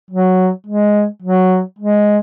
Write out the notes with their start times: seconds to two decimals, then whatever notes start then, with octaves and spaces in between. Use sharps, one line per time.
0.11 F#3
0.67 G#3
1.22 F#3
1.79 G#3